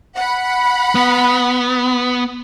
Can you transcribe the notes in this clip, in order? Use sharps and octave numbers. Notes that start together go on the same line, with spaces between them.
F#5 B5
B3